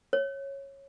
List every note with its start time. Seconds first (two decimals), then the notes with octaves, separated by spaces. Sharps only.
0.13 C#5